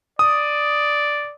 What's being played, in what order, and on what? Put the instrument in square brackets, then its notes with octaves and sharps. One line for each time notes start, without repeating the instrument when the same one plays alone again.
[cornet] D5 [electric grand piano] D#6